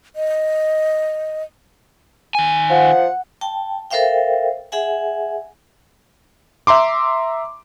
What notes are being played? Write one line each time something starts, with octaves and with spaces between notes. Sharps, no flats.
D#5
D#3 G#5
F3 F#5
G5 A5
A4 A#4 C5 E5 F5 G5
G#4 E5 F#5 G#5
E5 A#5 C6 D6